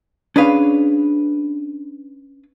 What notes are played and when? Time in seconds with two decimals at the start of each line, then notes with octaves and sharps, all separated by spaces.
0.36 C#4 D4 G#4 B4 F5